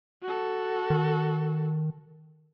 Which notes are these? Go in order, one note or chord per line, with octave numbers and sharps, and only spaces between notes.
F#4 A4
D#3